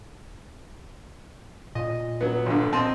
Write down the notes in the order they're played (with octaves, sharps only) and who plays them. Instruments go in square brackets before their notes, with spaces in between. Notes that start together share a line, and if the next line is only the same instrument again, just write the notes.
[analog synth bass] A#2 [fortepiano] D#5
[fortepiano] F#3 B3
A#1 D3
C4 D#5 A5